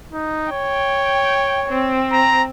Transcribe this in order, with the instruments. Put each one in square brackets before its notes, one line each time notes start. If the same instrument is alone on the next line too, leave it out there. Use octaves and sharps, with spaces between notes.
[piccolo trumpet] D#4
[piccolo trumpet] C#5 [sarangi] G5
[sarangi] C4
[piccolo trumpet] A#5